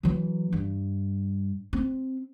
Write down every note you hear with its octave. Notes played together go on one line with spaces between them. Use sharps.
E3 F#3
G2
C4